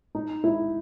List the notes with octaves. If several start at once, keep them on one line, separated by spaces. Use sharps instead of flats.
D#4
E4